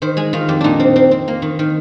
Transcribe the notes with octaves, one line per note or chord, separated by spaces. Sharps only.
D#3 C5
G#3 G#4
D#3 F4
F2 G4
A#2 D4 D#4
C4
C4
C4
A#3
D#3
D#3